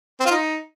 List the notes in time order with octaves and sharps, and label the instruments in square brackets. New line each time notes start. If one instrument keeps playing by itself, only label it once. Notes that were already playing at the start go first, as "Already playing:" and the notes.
[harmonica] C4
F4
D#4